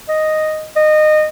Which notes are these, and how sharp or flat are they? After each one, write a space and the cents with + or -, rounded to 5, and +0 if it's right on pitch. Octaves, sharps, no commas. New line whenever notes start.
D#5 -5
D#5 -25